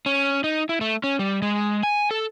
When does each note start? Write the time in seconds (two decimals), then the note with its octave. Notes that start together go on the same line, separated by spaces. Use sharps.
0.06 C#4
0.44 D#4
0.69 E4
0.81 A3
1.04 C#4
1.19 G3
1.42 G#3
1.83 G#5
2.11 A4